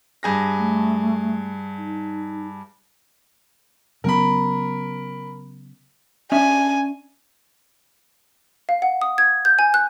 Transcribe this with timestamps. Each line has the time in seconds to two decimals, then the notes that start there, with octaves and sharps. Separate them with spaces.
0.23 G2 G#4 A#6
0.59 A3
1.78 D#4
4.04 C#3 F#3 B3 A#4 B5
6.32 C#4 D4 E5 G#5
8.69 F5
8.82 F#5
9.02 D#6
9.18 G#6
9.45 G6
9.59 G#5
9.74 F#6